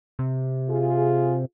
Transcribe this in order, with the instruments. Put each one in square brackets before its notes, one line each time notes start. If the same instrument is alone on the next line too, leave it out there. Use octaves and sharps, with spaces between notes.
[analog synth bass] C3
[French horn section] F4 G#4